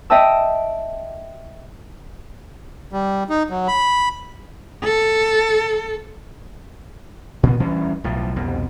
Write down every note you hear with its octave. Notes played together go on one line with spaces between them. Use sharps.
D#5 E5 G5 A5 E6
G3
D#4
F#3
B5
A4
A#2 B3
D2 E3 G3 C#4
B1 A2 F3
C2 F2 B2